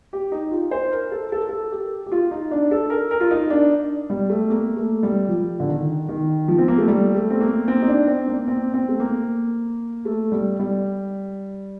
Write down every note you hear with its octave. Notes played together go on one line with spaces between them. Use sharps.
G4
D#4
F4
C5
A#4
A4
A4
A#4
A4
G4
G4
F4
D#4
D4
A4
A#4
A#4
F4
D#4
D4
G3
A3
A#3
A3
G3
F3
D3
D#3
D#3
F3
C4
A#3
A3
G3
A3
C4
A#3
C4
D#4
D4
C4
A#3
C4
C4
A3
A#3
A3
G3
G3